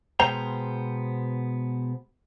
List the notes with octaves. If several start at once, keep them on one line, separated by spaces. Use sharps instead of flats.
B2 G#3 B3 C5 G5 A#5